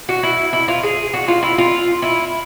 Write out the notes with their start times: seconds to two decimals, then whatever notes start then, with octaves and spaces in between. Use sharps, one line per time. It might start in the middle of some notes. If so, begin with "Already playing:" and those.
0.09 F#4
0.23 E4
0.53 E4
0.68 F4
0.83 G#4
1.14 F#4
1.28 F4
1.43 E4
1.58 F4
2.02 E4